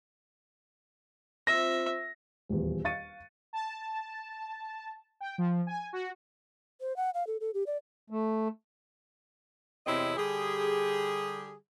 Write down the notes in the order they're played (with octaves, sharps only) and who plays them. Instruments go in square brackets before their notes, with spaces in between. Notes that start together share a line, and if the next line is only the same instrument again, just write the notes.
[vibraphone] C4 F4 C5 [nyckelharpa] E5 [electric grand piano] A#6
[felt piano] D#1 E2
F5 C#6 A6 C#7 D#7
[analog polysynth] A5
G5
F3
G#5
F#4
[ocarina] C5
F#5
F5
A4
A4
G4
D5
[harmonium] A3
[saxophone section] E2 C3 C4 E4 C#5 D#5
D3 G3 G4 G#4